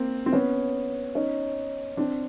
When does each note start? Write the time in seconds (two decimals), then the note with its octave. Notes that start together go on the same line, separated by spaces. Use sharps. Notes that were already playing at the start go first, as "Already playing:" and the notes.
Already playing: A#3 C4
0.26 C4
0.33 B3 C#4
1.15 C#4 D#4
1.97 C4 D4